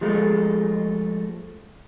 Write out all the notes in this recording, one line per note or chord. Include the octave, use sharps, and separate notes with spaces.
F3 G#3 A3